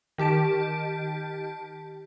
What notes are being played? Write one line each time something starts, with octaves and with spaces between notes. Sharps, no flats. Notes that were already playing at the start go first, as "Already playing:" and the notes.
D#3 G4 A5 D7